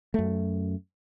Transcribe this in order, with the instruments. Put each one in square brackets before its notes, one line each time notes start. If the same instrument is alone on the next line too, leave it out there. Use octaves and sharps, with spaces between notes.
[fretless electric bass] F#2 A3